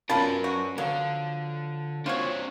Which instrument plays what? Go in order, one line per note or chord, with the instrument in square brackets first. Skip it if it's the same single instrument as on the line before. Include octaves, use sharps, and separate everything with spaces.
[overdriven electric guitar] F#3 A#4 [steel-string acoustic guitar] C#4 B4 D5 [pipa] F4 A5 B5
[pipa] F#4
[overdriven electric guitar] D3 [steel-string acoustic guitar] F3 [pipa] F#3
[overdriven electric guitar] C4 D4 [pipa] F4 F#4 C#5